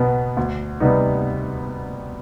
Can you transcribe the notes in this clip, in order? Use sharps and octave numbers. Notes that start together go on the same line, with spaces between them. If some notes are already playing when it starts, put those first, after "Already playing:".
Already playing: B1 B2 B3
D2
C3 G3 B3 D#4